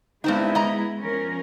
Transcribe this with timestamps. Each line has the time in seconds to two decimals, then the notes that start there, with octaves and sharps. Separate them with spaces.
0.24 G2 G#3 B3 C4 D#4 E4
0.55 D#5 A#5
1.00 F3 C#4 A#4